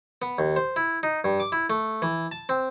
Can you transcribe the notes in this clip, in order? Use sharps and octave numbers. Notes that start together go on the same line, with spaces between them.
B3
D#2
C5
E4
D#4
G2
D6
E4
A3
E3
A5
C4